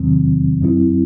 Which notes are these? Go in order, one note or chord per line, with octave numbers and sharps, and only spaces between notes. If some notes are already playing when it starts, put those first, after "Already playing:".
Already playing: E2 C3 D#3 F#3 C4
F#2 F#3 C4 E4